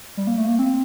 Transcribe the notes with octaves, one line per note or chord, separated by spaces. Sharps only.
G3
A#3
A3
A#3
C4